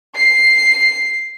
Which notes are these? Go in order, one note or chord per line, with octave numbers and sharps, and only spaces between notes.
C7